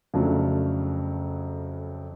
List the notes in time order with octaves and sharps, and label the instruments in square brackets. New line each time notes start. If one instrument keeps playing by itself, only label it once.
[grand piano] F2 C#3 F#3 A3 D4